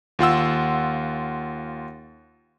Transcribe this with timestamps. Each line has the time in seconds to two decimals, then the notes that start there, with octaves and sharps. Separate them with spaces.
0.19 D#2 F4 F#5 E6